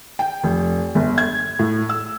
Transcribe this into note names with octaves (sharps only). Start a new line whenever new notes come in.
G5
F1
G1
G#6
A2
E6